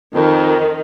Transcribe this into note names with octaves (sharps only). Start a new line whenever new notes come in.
F2 D#3